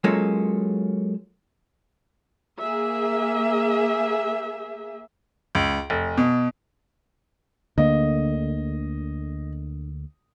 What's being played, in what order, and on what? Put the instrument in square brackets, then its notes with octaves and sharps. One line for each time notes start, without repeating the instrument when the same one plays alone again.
[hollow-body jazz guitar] F#3 G#3 A#3 C#4 F4 A4
[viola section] A#3 G#4 E5
[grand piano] C#2
F1
B2
[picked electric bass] D2 A#3 [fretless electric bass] D3 [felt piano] D#5